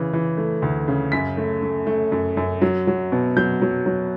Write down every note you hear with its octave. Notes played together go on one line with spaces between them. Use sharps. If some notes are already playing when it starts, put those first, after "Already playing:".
Already playing: C#3 E3
E3
A3
D2
C#3
F#2 B6
A3
A3
A3
F#2
F#2
F#3
F#3
B2
F#3 G6
F#3
F#3